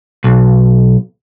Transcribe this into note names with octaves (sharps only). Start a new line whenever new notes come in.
B1